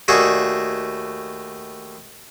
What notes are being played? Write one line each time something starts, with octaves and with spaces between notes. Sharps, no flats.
D#2 A3 F#4 G#4 D5 A5